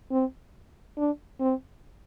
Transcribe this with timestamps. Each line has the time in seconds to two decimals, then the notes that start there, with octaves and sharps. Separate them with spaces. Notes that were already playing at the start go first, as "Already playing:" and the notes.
0.11 C4
0.97 D4
1.40 C4